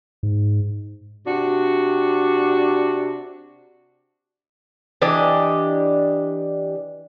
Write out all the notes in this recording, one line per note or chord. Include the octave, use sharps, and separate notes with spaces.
G#2
C3 D4 F#4
E3 D4 G4 D#5